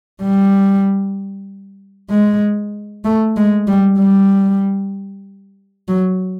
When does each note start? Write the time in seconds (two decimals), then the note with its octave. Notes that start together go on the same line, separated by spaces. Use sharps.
0.22 G3
2.10 G#3
3.05 A3
3.36 G#3
3.68 G3
3.99 G3
5.88 F#3